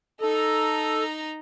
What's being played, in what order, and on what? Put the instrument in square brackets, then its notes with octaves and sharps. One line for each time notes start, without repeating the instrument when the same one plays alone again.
[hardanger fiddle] D#4 A#5 [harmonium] A4